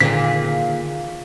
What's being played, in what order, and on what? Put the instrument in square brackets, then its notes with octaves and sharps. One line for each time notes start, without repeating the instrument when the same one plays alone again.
[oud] A#2 [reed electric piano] D3 D#3 G#4 [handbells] B6